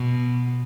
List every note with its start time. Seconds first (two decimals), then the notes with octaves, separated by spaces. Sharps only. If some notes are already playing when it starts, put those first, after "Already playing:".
Already playing: B2